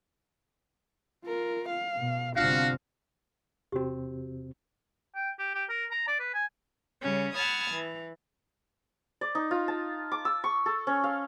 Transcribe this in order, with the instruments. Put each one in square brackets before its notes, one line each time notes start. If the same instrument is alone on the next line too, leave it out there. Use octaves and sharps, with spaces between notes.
[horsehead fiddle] F4 A#4
F5
[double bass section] B2
[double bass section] G1 C3 C4 [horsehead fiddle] D4 F4 [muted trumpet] F#4 [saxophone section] F5
[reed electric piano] E2 C3 C4 [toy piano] F#4 G4
[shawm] G5
G4
G4
A#4
A#5
D5
B4
G#5
[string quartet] C#3 G3 C#4
F#5 A5 B5 D#6 F6 G#6
E3
[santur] D5
D#4
F4
A5
D6
E6
C#6
A4
C#4
F5